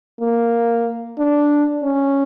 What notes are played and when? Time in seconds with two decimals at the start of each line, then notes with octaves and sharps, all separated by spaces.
0.20 A#3
1.18 D4
1.83 C#4